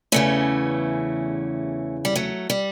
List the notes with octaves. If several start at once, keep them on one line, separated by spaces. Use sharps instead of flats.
E2 C#3 E3 A3 C#4
G3
F#3 A3
G3